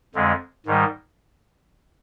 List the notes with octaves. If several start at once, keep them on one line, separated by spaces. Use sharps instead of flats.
F2 D3 G#3
G#2 D#3 G3